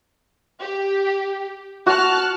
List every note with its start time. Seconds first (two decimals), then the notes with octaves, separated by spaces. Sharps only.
0.61 G4
1.86 F#4 A5 F6 F#6